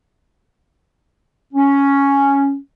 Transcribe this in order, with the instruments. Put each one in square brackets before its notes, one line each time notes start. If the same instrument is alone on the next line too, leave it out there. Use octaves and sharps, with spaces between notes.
[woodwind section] C#4